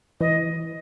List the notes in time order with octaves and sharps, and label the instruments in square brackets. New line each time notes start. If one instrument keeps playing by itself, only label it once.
[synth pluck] E3 [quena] D#5